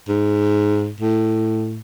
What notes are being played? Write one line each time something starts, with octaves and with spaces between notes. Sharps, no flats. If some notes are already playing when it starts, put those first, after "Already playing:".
G#2
A2